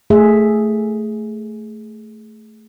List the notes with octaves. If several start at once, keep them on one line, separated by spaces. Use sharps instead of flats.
A3 G#4 E5